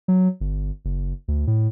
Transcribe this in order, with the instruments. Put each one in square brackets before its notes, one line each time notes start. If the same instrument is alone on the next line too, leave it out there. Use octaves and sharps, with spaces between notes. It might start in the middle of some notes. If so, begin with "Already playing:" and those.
[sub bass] F#3
G1
F#1
D2
A2